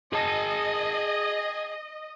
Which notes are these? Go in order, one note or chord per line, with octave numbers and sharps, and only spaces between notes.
G#4 D#5 A5